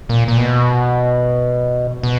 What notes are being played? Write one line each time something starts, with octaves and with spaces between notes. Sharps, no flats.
A#2
A#2
B2
B2